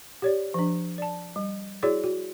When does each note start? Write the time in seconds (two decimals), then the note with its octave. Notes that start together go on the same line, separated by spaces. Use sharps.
0.22 G4 C#5 D5
0.54 F3 D4
0.98 D5 A5
1.36 G3
1.83 E4 F#4 G#4 C#5 D5
2.04 F#4